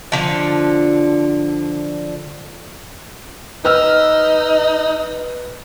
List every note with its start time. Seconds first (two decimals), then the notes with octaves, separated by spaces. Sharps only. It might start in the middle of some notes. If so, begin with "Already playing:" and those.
0.12 D3 F3
3.65 D#4 B4 E6 F6